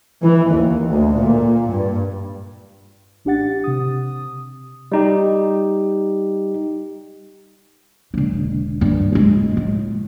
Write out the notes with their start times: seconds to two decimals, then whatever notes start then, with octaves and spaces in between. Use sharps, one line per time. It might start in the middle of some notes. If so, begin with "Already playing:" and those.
0.23 E3
0.53 D#2
0.89 D2
1.19 A#2
1.72 G2
3.25 A1 D4 G4 F#5 A6
3.64 C3 D#6
4.92 G3 D#4 G4
8.14 E1 D3
8.81 G2 D#3
9.13 E1 G#3
9.57 A2